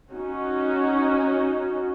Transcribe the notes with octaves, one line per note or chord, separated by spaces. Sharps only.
C#4 D#4 F#4